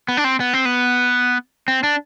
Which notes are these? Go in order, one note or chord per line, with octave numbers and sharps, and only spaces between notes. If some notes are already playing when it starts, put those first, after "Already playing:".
B3
D4
C4
B3
C4
B3
C4
D4